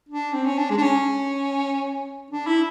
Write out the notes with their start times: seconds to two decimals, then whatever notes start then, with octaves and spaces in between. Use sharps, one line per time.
0.09 D4
0.34 C4
0.46 C#4
0.58 D4
0.70 G#3
0.78 D4
0.82 C#4
2.31 D4
2.47 E4